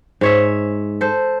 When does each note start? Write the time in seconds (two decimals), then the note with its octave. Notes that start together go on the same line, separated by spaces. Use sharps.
0.21 G#2 C#5 E5
1.01 A4 C5